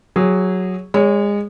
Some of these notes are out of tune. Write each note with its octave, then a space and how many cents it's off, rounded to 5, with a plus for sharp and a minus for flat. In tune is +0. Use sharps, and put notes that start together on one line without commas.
F#3 +0 G#4 -20
G#3 -25 C#5 +15